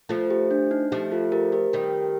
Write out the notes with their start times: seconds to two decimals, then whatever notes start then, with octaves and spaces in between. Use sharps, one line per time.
0.09 F3 A3 F4 A4
0.30 G4
0.51 D4
0.71 D#4
0.92 F3 A3 G4
1.12 F4 A4
1.32 G4 A#4
1.52 G4 A#4
1.73 D#3 G3